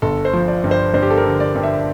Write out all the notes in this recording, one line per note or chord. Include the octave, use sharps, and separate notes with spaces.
G1 A4
C5
F3
D5
G2
C5
G2 C5
G4
A4
A#4
D3
D5
G2
E5